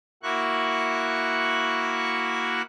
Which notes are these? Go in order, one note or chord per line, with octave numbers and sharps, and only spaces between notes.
A#3 E4 F#4 C#6 F#6